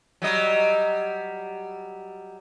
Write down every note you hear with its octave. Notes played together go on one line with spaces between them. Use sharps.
F#3 G3 D#5